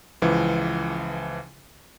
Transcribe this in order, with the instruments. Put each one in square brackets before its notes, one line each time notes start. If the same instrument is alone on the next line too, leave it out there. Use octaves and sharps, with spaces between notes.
[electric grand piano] C#2 E3 F3